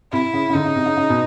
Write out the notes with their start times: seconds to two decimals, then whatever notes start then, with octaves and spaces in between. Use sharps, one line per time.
0.12 C3 E4
0.34 C#3
0.50 C#3
0.54 D3 D#4
0.65 C#3
0.76 C3
0.86 C#3
0.97 C#3
1.10 B2